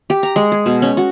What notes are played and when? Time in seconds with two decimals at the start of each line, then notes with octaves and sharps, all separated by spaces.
0.10 G4
0.23 A#5
0.36 G#3
0.52 G#4
0.66 B2
0.82 C#4
0.97 F#4